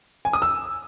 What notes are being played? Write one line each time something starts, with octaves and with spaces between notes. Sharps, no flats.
G#5
D#6
E6